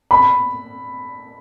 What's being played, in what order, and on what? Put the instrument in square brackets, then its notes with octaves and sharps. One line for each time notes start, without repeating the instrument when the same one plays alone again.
[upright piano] B5